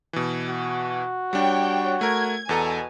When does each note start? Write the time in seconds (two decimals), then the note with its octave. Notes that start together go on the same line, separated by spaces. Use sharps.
0.13 B2 E3
0.49 F#4
1.33 G3 D4 C#5 G5
2.01 A3 A#4 G#6
2.49 E2 B2 A4 G#5 A#5